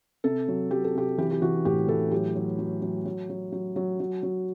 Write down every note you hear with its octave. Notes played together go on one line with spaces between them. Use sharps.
C3 A4
F#3
F#3 G4
A4
C3 G4
E3 G4
G4
E3 F#4
A2 G4
E3 A4
F#3 G4
F#3
F#3
F#3
F#3
F#3
F#3
F#3
F#3
F#3